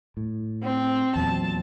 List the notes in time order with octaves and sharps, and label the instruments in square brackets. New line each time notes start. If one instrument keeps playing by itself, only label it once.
[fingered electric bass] A2
[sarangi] C4
[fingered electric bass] E2 A#2 F#3 [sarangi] A5